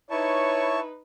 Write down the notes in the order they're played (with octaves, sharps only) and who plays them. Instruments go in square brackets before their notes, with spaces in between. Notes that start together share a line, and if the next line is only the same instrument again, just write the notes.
[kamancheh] D#4 B4 [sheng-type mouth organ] E4 A5 C#6 [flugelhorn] C#5